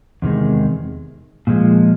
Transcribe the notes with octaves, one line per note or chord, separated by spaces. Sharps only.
E2 C3 D#3 G#3
A#2 F3 G#3